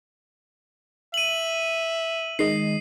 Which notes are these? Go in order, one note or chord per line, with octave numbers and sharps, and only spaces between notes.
E5 D#7 F#7
D#3 G#3 D#5 C7